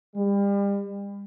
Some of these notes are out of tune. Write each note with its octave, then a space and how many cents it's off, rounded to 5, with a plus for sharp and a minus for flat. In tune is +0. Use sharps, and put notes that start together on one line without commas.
G3 +35